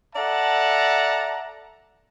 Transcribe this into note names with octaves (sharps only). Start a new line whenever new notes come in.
A4 D5 E5 F#5 A5 A#5